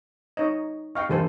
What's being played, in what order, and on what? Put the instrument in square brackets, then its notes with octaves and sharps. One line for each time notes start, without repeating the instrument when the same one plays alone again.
[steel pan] D#4 C#5 D#5
[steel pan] D#5 F5 G5 [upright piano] C#6 F6
[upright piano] E2 G2 A#3 [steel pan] G4 A4 C5